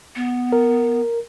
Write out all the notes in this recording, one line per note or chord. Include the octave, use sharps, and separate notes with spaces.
B3
A#4